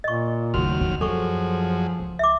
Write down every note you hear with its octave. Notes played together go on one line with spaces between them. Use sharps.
A#2 D#5 C#6
D#2 C#3 F#3 A3 F#4 F6
F2 C#4
F#2 F3 F#3 F4 G#4 A4 C#6
C#2
E5 D6